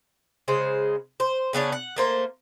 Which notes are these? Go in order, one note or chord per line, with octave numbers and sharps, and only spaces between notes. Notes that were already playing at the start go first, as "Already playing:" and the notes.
C#3 G#3 C5
C5
C#3 B3 D4 C#5
F#5
A3 A#3 C5